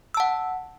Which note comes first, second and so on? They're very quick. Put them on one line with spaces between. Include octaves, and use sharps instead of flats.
E6 A5 F#5